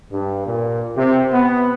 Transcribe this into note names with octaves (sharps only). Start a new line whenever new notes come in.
G2
A#2
C3
B3